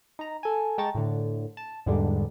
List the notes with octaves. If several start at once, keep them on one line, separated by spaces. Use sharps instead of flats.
D#4 A#5
A4 G#5
G#3 G5 A5 A#5 C#6 A6
A2 D3
A5
E2 G#2 D3 G3 G#3 D4